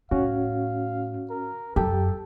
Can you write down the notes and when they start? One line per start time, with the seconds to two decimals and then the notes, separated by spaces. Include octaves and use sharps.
0.11 A2 C#4 F#4 F5
1.30 A#4
1.76 F#2 G4 A4 G5